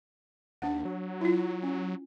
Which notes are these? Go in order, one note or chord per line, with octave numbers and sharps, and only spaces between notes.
D#2 D4 F#5
F#3
E4 F4
C#4